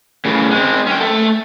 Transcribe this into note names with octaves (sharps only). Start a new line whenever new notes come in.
A2 C#3
G#3 C4
C#4 G5
A3 A4